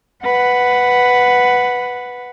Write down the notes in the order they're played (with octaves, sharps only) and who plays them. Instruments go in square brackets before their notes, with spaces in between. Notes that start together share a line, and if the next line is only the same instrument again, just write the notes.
[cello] B4 F#5